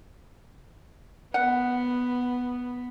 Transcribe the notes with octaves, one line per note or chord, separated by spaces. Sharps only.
B3 F#5